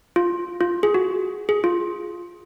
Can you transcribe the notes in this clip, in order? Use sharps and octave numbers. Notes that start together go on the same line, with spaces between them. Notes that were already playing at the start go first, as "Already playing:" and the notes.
F4
F4
G#4
F#4
G#4
F4